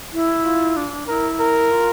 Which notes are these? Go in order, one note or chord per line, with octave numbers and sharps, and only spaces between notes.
E4
F4
D4
E4 A#4
A#4
F4